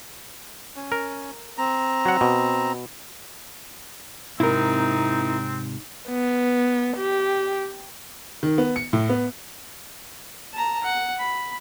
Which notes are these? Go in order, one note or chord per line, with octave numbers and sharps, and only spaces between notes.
C#4
A#4
C4 A#5
F#3 F#5
B2
G#2 C3 C4 D#4 E4 A#4
B3
G4
D#3
B3
C#7
A2
B3
A5 A#5
F#5
B5